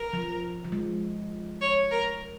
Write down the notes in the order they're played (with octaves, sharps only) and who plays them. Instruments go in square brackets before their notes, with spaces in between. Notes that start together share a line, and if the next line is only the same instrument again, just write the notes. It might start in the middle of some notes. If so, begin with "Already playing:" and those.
Already playing: [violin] A#4
[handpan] F3
F3
G#3
[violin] C#5
A#4